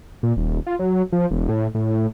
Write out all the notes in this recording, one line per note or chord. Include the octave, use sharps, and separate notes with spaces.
A#2
D#1
F4
F#3
F3
E1
A2
A2